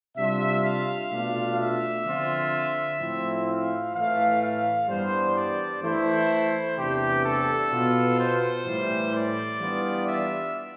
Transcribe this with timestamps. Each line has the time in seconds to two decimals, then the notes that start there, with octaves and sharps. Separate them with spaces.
0.16 C3 G3 D4 F4 E5
0.63 F5
1.11 B2 A3 D4 F4
1.58 E5
2.05 D3 F3 C4 F4
2.99 A2 F3 C4 E4
3.47 F5
3.94 A2 E3 A3 F5
4.41 F5
4.88 G2 E3 G3 B3 D4 C5
5.35 D5
5.82 E3 A3 E4 C5
6.77 E2 C3 E3 A3 D4 G4
7.24 A4
7.71 B2 B3 F4
8.19 C5
8.65 A2 E3 G3
9.13 D5
9.60 E3 G3 B3 D4 F4
10.07 E5